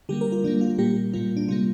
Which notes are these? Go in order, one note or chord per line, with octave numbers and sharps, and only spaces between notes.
D3 G3 A#3 G4
A#4
F4
D3 G3 A#3 D4
F4
A#2 G3 A#3 G4
A#2 G3 A#3 F4
D4
C3 G3 A#3 F4